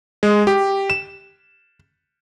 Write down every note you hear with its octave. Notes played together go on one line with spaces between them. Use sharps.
G#3
G4
E7